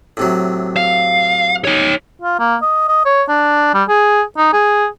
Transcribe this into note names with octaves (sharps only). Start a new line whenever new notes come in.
A2 C3 F#3
F5
D#4 C#5
F4
A#3
D#5
D#5
C#5
D4
G3
G#4
D#4
G#4